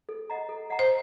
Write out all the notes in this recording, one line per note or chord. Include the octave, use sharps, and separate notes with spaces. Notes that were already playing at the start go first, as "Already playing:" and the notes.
A4
D#5 F#5 A#5
A4
D#5 F#5 A#5
C5